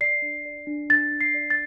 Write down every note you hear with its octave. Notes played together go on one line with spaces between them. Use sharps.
D5 C7
D4
D5
D4
D4 A6
D4
C7
D5
A6